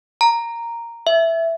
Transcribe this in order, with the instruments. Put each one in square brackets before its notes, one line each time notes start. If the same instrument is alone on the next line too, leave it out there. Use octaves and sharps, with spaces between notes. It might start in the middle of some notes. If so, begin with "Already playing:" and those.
[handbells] A#5
E5